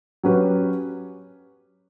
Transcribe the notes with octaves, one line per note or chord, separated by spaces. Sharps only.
F#3 C#4 G4 B4